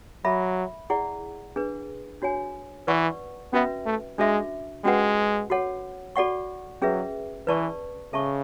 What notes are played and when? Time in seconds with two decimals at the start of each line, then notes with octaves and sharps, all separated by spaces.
0.25 F#3 A4 E5 B5
0.90 E4 G#4 D5 F#5
1.56 D4 G#4 B4
2.22 D4 F#4 C#5 G#5
2.87 E3 B4 D5 F#5 C#6
3.53 B3 C#4 F#4 B4 E5
3.86 A3
4.18 G#3 D4 F#4 A4 E5
4.84 G#3 C#4 F#4 B4 F#5
5.50 F#4 A4 C#5 F#5
6.16 F#4 A4 D5 F#5 C#6
6.82 F#3 C#4 G#4 B4 E5
7.47 E3 B4 D5 A5 C#6
8.13 C#3 A4 E5 A5 C#6